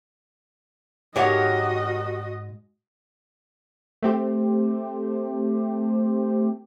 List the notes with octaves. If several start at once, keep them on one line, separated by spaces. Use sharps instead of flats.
G#2 F#4 G4 A#4 C#5 D#5 F#5
A3 C4 G4